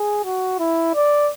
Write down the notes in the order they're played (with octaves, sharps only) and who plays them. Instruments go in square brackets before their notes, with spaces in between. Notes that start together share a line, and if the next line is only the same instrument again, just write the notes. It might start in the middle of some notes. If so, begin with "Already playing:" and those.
Already playing: [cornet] G#4
F#4
E4
D5